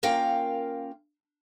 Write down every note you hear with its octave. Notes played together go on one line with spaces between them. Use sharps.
A#3 C#4 F4 A#4 F5 G5